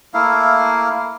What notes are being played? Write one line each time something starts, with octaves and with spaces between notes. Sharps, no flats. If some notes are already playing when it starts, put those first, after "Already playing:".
A3 A#3 E4 F5